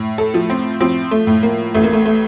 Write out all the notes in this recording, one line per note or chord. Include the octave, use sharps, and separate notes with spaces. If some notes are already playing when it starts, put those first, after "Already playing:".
Already playing: A2
A4
F3
C4
F3 C4
A3
A2
A#3
A1 A3
A#3
A3
A3